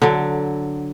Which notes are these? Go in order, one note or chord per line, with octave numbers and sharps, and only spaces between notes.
D3 F#3